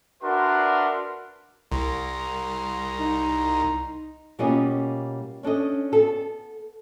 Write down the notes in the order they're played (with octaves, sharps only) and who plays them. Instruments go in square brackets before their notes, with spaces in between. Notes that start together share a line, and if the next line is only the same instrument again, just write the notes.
[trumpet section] D4 F#4 A#4 B4 E5 C6
[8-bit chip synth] C2 [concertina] A#5 C6
[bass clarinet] D#4
[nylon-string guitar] B2 G3 A#3 C#4 F4 D#5
C#4 D4 A4 D#5
B3 A4